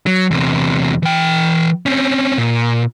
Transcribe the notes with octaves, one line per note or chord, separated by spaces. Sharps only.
F#3
E2 C3
E3 G5
C4 C#4
A#2